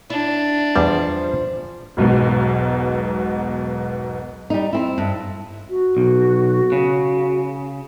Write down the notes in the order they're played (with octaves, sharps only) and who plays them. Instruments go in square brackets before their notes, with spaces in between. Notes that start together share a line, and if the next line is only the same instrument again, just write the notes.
[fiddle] D4 [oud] E4
[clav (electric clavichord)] E2 G3 [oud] F3
[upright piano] E1 B1 G#2 B2
[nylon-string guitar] G3 D#4
C4 E4
G2
[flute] F#4
[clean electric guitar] B1
C#3